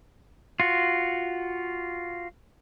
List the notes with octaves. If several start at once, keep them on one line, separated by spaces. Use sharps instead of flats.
F4 F#4